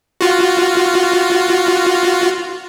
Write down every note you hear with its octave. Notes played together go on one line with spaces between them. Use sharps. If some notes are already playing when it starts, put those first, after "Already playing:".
F4 F#4